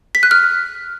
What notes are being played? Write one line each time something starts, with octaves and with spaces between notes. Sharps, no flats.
B6
F#6
F6